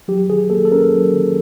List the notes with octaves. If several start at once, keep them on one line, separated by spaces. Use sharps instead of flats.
F#3 G4
D#3 G#4
A#3 A4
A4
C#4 A#4
F#3
D#3